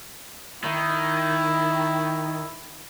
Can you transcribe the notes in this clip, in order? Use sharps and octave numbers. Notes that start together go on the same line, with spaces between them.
D#3 E4